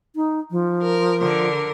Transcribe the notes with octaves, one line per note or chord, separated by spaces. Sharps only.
D#4
F3
A#4
D3 A#4